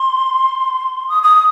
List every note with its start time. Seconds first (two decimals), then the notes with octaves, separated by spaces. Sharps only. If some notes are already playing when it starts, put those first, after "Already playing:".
Already playing: C6
1.09 D#6
1.23 D#6